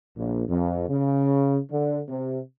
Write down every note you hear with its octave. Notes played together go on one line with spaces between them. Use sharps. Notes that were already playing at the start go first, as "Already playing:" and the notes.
A#1
F2
C#3
D3
C3